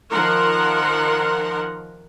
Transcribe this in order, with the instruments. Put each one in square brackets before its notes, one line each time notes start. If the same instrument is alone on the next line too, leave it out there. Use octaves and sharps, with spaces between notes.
[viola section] D#3 F3 A#4 F#5 A#5 C6